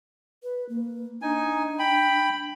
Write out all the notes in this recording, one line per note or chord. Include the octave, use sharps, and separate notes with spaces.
B4
A#3
D4 D#4 G#5
G5 B5